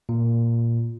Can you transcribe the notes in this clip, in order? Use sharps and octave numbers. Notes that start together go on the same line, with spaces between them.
A#2